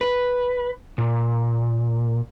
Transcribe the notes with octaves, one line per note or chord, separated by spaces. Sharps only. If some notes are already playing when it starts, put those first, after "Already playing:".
B4
A#2